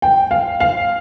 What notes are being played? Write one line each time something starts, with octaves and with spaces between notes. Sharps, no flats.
G5
F5
F5